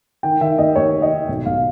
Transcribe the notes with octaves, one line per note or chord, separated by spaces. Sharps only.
D#3 G5
D#3 E5
D#2 D#5
D#2 C#5
D#3
D#5
D#3
B1
B1 F5